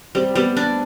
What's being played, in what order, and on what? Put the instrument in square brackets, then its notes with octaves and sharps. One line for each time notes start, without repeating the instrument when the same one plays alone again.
[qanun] G3 [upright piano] C4
[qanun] G3 [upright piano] B3
[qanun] D4